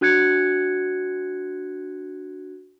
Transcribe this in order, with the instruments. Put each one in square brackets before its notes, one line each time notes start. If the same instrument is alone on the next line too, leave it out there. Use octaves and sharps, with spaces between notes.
[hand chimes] D4 F#4 F#6 G#6 C#7